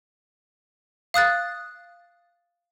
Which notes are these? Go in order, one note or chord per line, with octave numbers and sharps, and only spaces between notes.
F5 D#6 F#6 A6